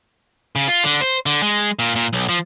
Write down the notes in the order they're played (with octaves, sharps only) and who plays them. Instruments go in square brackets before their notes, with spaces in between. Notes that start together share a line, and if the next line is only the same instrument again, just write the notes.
[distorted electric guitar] C#3
F4
D3
C5
D3
G#3
A#2
A#2
B1
F3